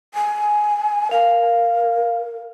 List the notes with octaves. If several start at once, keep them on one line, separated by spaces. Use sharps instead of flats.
G#5
A#4 F5